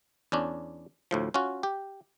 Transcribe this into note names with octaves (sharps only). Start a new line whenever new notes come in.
E2 C#4 D4
D2 A2 F3
C#4 F4 F#4
G4